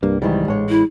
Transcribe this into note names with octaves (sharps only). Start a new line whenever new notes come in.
C2 G2 A#3
G#2 D#3 E3 G3
A1 G#3 C#5
E4